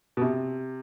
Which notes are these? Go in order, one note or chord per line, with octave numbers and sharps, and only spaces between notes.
B2
C3